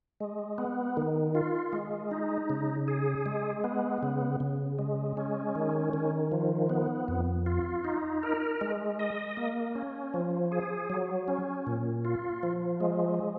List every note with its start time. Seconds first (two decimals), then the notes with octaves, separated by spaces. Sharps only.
0.20 G#3
0.58 B3
0.97 D#3
1.35 F4
1.73 G#3
2.11 D#4
2.50 C#3
2.88 G#4
3.26 G#3
3.64 B3
4.03 C#3
4.40 C#3
4.79 G#3
5.17 C#4
5.55 D#3
5.93 D#3
6.32 F3
6.70 B3
7.08 F2
7.46 F4
7.84 D#4
8.23 A#4
8.61 G#3
8.99 D#5
9.37 A#3
9.75 C#4
10.14 F3
10.52 G#4
10.90 F#3
11.28 C#4
11.67 A#2
12.05 F4
12.43 F3
12.80 G#3